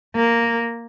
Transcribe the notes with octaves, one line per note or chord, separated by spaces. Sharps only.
A#3